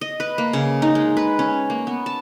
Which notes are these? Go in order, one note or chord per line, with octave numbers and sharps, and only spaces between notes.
D#5
B4
A#3
C#3
D#4
G#3
B4
C#4
A#3
B3
A5